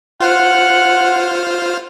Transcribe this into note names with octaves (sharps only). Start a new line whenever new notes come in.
F4 C5 F#5 F6